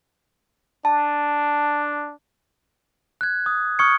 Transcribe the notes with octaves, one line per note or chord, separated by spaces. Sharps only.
D4 A5
F#6 G#6
D#6
C#6 D#6 F6 G#6 C#7